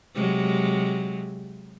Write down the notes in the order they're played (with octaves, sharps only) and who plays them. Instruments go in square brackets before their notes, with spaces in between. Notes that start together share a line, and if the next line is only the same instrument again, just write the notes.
[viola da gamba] C3 F#3 G#3